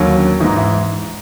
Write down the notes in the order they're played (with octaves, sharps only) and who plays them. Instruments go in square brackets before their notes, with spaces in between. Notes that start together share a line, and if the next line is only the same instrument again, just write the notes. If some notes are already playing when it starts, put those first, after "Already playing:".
Already playing: [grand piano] D#2 D3 F#3
C#4
G#2 E3 D#4
E4